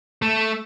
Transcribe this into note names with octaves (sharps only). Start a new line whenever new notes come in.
A3